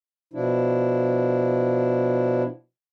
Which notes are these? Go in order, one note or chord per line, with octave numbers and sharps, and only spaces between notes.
B2 F3 D4 E4